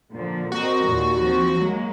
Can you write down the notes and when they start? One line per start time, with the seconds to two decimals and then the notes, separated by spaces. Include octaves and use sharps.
0.11 A#2 D3 F3
0.52 C4 F#4 A#4 D#5
0.84 D#2 A#2
1.20 F3 C4
1.57 F#3 G#3 A#3